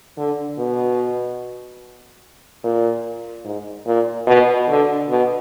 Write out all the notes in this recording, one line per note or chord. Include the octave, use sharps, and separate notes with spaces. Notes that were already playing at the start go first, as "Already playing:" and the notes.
D3
B2
A#2
G#2
A#2
B2
D3
B2